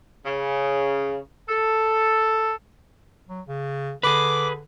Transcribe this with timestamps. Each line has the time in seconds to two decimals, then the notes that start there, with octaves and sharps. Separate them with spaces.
0.25 C#3
1.48 A4
3.29 F#3
3.47 C#3
4.03 D3 G#4 B4 D6